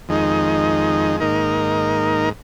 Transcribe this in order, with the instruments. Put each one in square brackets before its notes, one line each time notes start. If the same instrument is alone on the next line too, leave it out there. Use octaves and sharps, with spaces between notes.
[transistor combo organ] F2 D#3 G#3 D#4
G#2 D#3 A#3 D#4 A#4